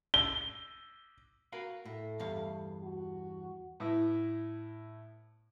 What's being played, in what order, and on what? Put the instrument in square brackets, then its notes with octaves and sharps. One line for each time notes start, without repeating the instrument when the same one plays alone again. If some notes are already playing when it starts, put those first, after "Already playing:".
[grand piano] G7
[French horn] F#4 [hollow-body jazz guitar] A#4 B4 F5
[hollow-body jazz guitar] A2 [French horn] A3
[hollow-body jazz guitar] E2 G2 F5
[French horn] F#4
[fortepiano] A2 B3 E4